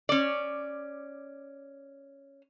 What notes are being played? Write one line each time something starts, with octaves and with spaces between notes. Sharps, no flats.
C#4 D5